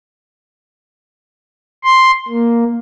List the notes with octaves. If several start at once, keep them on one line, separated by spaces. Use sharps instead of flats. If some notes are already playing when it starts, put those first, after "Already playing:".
C6
A#3